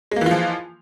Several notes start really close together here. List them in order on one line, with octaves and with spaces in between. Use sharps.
G#3 A#3 E3 F4 F3